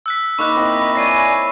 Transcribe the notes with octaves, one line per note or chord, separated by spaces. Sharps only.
E6 F#6 B6
A#3 D#4 D#5 B5 C#6 D6 F#6
C4 E4
C#5 D5 G#5 B5 A#6 C7 D#7